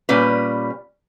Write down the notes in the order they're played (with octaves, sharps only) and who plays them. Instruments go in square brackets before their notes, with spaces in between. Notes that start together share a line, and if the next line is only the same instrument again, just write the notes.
[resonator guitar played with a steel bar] A#2 G3 C#4 B4